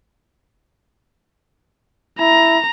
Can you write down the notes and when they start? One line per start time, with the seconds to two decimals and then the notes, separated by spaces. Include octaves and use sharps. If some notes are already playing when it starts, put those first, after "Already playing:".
2.20 E4 A#5